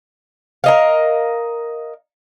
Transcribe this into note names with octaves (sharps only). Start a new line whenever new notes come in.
A#4 D#5 F5